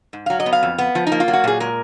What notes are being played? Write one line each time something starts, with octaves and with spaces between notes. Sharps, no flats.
G#2
F#3 F5
D#5
B3
F5
F2
B3
F3
D#4
A#3
F4
F#3
F#4
A#2 G#4
G#3 A#4